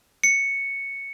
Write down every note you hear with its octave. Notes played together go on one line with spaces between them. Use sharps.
C#7